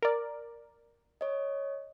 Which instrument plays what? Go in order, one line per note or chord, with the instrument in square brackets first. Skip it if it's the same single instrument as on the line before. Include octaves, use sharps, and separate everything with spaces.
[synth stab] A#4 D5
[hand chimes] C#5 D#5